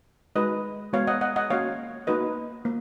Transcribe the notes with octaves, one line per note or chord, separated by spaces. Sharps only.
G#3 D#4 F#4 B4 D#5
G#3 B3 F#4 C#5 F5
D#5 F#5
D#5 F#5
D#5 F#5
A#3 C#4 F#4 C#5 F5
A#3 D#4 F#4 B4 D#5
A#3